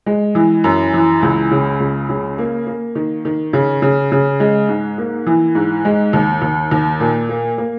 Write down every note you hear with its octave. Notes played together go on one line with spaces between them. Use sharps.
G#3
E3
F#2
E3
C#2
C#3
C#2
C#3
A#3
A#3
D#3
D#3
C#3
C#3
C#3
G#3
G#2
A#3
E3
G#2
G#3
D#2
D#2
D#2
A#2
A#3
A#3